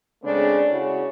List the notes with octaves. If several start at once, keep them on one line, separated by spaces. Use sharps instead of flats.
C#3 G#3 A3 C4 D4
C#3 E4 F#4 C#5